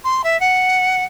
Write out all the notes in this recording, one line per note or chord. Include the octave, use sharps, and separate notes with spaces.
C6
E5
F#5